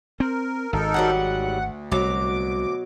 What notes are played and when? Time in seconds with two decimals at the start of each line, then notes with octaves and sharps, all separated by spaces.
0.20 C4 A#4
0.73 G#1 D#4 A4 A#4
0.94 G#2 F#3 G3 F#5
1.36 D2
1.92 C2 B2 F#3 D6